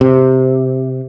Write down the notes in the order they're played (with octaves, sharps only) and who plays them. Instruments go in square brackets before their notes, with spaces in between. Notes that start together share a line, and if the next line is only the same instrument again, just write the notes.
[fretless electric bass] C3